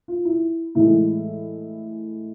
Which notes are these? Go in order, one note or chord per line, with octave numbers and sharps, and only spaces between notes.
F4
E4
A2 E3 G#3 E4